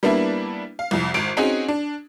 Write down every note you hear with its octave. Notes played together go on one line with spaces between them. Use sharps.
G3 A#3 B3 D4 E4
F5
C2 F2
G#1 D7
C4 C#4 D#4 F#4 G#4
D4